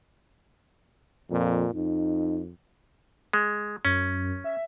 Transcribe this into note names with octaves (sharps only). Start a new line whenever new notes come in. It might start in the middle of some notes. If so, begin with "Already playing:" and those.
F2 A#2
F2 D#4
G#3
F#2 C#4
E5